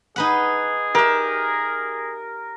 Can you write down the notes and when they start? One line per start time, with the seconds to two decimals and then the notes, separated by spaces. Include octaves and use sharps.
0.16 D#4 G#4 B4 F#5
0.95 G4 A#4 E5